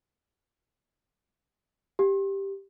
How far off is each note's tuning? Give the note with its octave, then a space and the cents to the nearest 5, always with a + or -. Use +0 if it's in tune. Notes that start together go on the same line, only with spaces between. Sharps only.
G4 +0